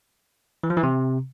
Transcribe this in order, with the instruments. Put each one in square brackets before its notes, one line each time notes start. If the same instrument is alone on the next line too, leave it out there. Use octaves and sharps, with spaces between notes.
[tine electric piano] E3
F3
E3
C3